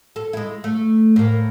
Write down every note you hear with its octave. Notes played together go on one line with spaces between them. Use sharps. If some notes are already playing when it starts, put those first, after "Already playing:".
A4
G#3 E4
A3
A2 A#3